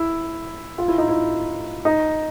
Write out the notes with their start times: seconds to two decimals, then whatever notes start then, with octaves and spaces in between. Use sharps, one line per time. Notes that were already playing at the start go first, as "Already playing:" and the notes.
Already playing: E4
0.78 F4
0.88 E4
0.98 D#4
1.09 E4
1.85 D#4